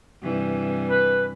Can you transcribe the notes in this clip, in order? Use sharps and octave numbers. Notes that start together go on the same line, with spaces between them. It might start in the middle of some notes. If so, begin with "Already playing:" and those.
G2 C3 E3
B4